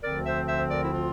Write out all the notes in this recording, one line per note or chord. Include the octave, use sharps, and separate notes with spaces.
D2 D3 F3 C4 A#4 D5
C5 E5
C5 E5
A#4 D5
E4
F4